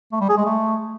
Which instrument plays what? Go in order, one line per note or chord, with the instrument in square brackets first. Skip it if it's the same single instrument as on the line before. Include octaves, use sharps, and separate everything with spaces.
[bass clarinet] A3
G3
G#4
G#3
A3